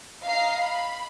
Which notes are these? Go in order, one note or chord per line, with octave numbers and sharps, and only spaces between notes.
D#5 F5 A#5 C7
B5